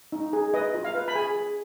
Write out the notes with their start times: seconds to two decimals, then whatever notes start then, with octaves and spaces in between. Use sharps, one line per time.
0.12 D#4
0.33 G#4
0.54 B4 D#5
0.74 F4
0.85 F5
0.95 B4
1.08 B5
1.15 G#4 G#5
1.36 G#4